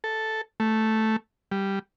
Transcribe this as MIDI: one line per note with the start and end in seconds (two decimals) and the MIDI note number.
0.04 0.41 69
0.60 1.16 57
1.51 1.79 55